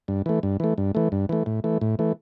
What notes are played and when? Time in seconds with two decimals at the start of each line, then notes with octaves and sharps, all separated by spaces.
0.08 G2
0.26 E3 A3
0.43 G2
0.60 E3 A3
0.78 G2
0.95 E3 A3
1.12 G2
1.29 E3 A3
1.46 A2
1.64 E3 A3
1.81 A2
1.99 E3 A3